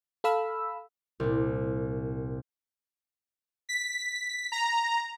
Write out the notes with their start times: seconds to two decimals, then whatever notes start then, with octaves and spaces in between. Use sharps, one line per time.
0.24 A4 F5 B5 E6
1.20 C2 A#2
3.69 B6
4.52 A#5